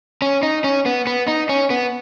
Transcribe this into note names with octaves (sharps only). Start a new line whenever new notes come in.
C#4
D#4
C#4
B3
B3
D#4
C#4
B3